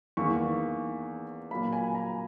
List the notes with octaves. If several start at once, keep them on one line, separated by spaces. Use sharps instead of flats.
E2 D#3 A#3 C#6
A#2 F#3 A#3 B5
G#5
A#5